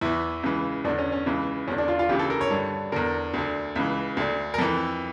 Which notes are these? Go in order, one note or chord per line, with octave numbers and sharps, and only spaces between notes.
E2 E3 E4
C#2 C#3 E3
E2 D3 D4
C#4
C#4
C#2 C#3 E3
E2 D3 C#4
D4
F4
F4
D2 C#3 E3 G4
A4
A#4
C#5
G2 D3
E2 D3 A#4
D2 D3
C#2 C#3 E3
D2 D3
A#4
F2 E3 A4